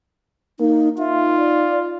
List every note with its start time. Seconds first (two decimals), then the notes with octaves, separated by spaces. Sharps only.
0.60 A#3 D#4
0.99 D#4 F4 E5
1.38 D5